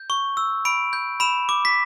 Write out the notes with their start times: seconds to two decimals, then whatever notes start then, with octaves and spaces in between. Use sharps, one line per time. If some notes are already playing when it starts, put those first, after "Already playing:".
Already playing: G6
0.10 C#6
0.37 E6
0.65 B5 D7
0.93 G6
1.20 B5 E7
1.49 D6
1.65 B6